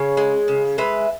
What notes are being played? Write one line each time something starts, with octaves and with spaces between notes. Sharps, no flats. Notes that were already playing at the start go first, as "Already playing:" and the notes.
Already playing: C#3 G#4 C#5
G#3
C#3
G#3 B4 E5